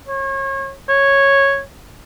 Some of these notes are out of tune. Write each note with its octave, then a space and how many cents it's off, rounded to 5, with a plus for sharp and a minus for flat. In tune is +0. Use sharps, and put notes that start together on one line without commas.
C#5 -35
C#5 -5